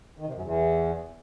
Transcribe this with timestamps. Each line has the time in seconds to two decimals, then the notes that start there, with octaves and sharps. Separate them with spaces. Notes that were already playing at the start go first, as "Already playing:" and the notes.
0.19 D#3
0.26 C3
0.34 F#2
0.42 E2